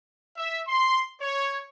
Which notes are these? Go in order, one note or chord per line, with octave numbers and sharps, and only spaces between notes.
E5
C6
C#5